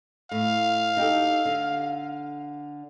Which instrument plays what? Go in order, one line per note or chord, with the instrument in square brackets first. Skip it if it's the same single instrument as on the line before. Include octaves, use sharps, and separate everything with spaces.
[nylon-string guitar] A2 [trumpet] F5
[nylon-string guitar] D#4 G4 A4
D3